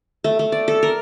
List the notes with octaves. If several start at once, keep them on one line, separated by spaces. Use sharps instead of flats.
A3
A3
D5
A4
A#4